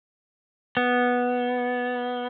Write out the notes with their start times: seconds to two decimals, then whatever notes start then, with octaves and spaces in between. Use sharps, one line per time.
0.77 B3